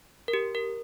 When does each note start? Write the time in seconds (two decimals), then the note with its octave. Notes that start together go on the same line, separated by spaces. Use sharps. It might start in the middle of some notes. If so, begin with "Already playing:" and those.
0.28 A#4
0.33 G4
0.55 A#4